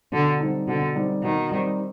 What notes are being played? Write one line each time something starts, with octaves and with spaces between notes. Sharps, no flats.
B2 D3
G3 C4 D#4
B2 D3
G3 C4 D#4
B2 D#3
G3 C4 D#4